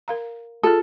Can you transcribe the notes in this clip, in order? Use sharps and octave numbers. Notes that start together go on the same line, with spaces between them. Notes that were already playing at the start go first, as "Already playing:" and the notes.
A#4 F5 A#5
F4 G#4 A4